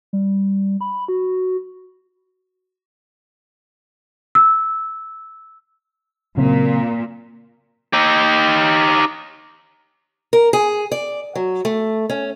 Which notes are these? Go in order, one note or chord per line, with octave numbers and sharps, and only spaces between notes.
G3
B5
F#4
E6
A#2 C#3 F#3 C4
D#4 G4
A#4
G#4
D5
F#3
A3
C#4